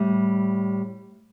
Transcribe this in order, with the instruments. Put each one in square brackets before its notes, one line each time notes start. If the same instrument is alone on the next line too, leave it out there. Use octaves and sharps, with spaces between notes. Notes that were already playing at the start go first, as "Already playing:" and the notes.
Already playing: [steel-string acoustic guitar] A2 G3